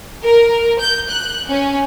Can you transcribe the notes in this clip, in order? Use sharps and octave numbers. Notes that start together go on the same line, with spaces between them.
A#4
G6
F#6
C#4